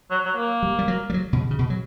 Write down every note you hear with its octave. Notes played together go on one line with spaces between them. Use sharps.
F#3
F#3
A#3
G3
G3
F#3
G3
F#3
B2
C#3
C#3
B2
F#3